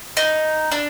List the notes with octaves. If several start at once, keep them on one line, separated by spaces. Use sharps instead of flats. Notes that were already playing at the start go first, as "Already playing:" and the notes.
D#4
D4